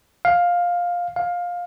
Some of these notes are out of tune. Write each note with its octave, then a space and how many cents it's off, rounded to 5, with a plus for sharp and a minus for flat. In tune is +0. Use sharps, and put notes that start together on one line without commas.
F5 +10
F5 +15